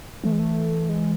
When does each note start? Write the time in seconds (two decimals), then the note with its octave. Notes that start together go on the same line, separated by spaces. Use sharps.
0.24 E3 A3
0.32 G#3
0.39 A3
0.89 G#3